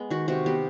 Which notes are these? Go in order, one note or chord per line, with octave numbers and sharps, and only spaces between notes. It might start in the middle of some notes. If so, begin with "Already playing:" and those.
Already playing: G#3 B3
D#3 F#4
C3 F#4
B3 G4